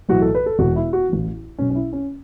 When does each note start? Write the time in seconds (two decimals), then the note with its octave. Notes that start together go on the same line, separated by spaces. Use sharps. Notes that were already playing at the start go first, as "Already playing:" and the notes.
0.09 B1 A2 E3 F#4
0.21 A4
0.35 B4
0.46 A4
0.59 E1 E2 B2 F#4
0.76 E4
0.93 F#4
1.09 A1 A2 E3
1.58 B1 B2 C#4
1.70 C#4
1.75 E4
1.93 C#4